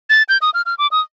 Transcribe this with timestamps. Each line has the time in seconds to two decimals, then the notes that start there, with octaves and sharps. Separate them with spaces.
0.10 A6
0.29 G6
0.42 D#6
0.54 F6
0.66 F6
0.78 D6
0.91 D#6